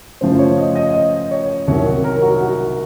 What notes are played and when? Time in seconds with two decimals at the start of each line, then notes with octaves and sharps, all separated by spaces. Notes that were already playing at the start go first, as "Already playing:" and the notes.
0.21 F#2 C#3 F3 A3 C5
0.39 C#5
0.58 D#5
0.75 D#5
0.94 D#5
1.31 C#5
1.68 C2 C3 D#3 F#3 C#5
2.04 A#4
2.22 F#4
2.41 F#4